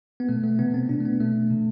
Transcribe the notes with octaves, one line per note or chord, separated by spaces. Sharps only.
B3
B2 A3
A3
C3 E3 B3
C4
B2 D4
A3
B3
B2 A3
C3 E3